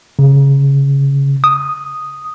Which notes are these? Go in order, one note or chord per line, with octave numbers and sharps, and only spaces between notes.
C#3
D#6